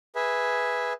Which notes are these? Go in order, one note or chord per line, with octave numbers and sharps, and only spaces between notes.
G#4 B4 E5